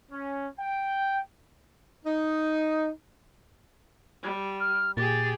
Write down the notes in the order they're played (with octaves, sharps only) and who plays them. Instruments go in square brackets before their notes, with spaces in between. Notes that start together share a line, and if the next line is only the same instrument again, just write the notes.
[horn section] C#4
G5
[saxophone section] D#4
[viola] G3
[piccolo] F6
[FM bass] A#2 [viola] G4 G#4 [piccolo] A6